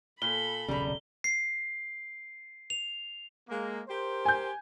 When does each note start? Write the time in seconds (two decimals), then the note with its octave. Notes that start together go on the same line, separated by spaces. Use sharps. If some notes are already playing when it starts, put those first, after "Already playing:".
0.22 A#2 A4 B5 G7
0.68 D#1 B1 C#3 G3 A#5
1.24 C7
2.70 F7
3.50 G#3 A#3
3.88 G4 A#4 C5
4.25 G#5 G6